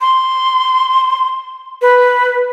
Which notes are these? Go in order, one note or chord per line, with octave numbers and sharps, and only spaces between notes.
C6
B4